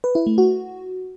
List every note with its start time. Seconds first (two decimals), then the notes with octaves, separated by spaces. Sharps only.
0.04 B4
0.15 E4
0.27 A3
0.38 F#4